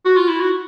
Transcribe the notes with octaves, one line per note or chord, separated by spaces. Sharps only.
F#4
F4
E4
F#4